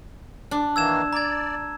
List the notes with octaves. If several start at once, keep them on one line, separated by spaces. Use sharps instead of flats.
D4
D#3 E3 A#3 E6 G#6 E7
D5 A#5 G#6